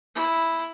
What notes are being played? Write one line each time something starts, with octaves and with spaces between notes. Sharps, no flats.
E4